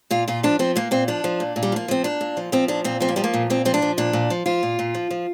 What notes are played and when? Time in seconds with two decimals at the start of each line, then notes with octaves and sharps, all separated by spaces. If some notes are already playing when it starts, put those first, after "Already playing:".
0.11 A#2 F4
0.28 A#2 F4
0.43 F3 D4
0.59 F3 C4
0.76 A#2 A#3
0.91 A#2 C4
1.08 F3 D4
1.24 F3
1.40 A#2
1.56 A#2
1.63 G3
1.72 F3 A#3
1.88 F3 C4
2.04 A#2 D4
2.21 A#2
2.37 F3
2.52 F3 C4
2.68 A#2 D4
2.84 A#2 C4
3.00 F3 C4
3.08 A#3
3.16 F3 G3
3.24 A#3
3.34 A#2
3.50 A#2 C4
3.65 F3 C4
3.74 D4
3.82 F3
3.98 A#2 D4
4.13 A#2
4.30 F3
4.46 F3 F4
4.63 A#2
4.79 A#2
4.95 F3
5.11 F3